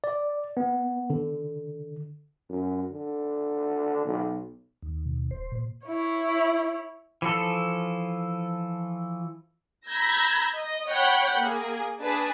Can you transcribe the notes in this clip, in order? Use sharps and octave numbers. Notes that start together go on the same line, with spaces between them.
D5
B3
D3
F#2
D3
B1
D#2
B2
D#1 C5
A#2
E4 C#5
E3 F3 A4
A#5 B5 E6 G6 G#6 A#6
D#5
C#5 F#5 G5 B5 F#6 G6
A#3 G#4
D4 G#4 B4 A5